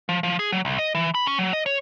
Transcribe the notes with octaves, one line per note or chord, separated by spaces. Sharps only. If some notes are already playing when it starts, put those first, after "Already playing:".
F3
F3
G#4
F#3
C2
D#5
E3
B5
C#4
F#3
D#5
C#5